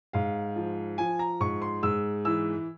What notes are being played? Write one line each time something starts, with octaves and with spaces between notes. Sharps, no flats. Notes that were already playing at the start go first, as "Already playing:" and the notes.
G#2 F5
F3
F3 G#5
A#5
G#2 C#6
C6
G#2 E6
E3 E6